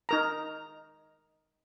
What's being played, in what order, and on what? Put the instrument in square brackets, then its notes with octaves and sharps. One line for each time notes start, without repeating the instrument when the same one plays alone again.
[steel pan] D#4 A#4 A#5